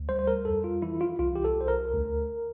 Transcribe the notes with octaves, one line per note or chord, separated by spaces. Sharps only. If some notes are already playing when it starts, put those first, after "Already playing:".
Already playing: D2
G3 C5
C5
A#4
F2 A4
F4
E3 E4
F4
C2 F4
G4
A4
C2 C5
A#4
D2